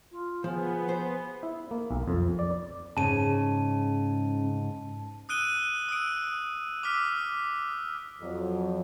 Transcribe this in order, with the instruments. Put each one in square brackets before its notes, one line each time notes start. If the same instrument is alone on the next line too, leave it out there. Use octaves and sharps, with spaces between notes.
[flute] F4
[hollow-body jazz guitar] F3 [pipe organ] B3 [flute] G#4
[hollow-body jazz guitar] C5
[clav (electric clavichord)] E4
A#3
B1
F2
D5
[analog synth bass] G#2 [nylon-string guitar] C#3 [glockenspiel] A5 D#7
[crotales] D#6 E6 F#6 D7 D#7 G7
D#6 E6 D7
D6 E6 F6 B6
[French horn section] F2 F#3